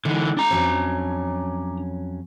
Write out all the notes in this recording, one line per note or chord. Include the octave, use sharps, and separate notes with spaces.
D3 E3 G#3
D4 A#5
F2 F#3 C#4